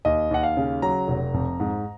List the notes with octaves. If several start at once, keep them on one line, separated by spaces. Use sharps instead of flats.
D#2 D#5
D#2 F#5
F5
C#3
F#3 A#5
F1
F2
G#2